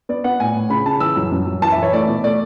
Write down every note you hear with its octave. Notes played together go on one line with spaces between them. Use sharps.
B3 D5
B3 F#5
A2 G#5
A2
C#3 B5
C#3 A5
E3 E6
F#2
F#2
F#2
E3 A5
E5
E3 C#5
A3 D5
B2
A3 D5